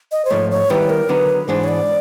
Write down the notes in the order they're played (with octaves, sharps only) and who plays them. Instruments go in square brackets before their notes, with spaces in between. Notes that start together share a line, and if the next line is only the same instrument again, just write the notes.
[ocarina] D#5
C5
[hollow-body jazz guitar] G#2 F3 A3 [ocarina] C#5
[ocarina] C#5
[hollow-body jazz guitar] D#3 G3 B3 E4 G4 [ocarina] B4
[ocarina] A#4
[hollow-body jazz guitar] D3 F#3 B3 D#4 [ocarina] B4
[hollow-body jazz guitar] G#2 E3 G#3 B3 D4 [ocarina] C5
[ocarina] C#5
D5